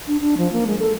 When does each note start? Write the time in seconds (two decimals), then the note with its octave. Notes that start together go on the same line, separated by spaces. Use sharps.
0.08 D4
0.20 D4
0.38 F3
0.52 A#3
0.67 G#3
0.79 A4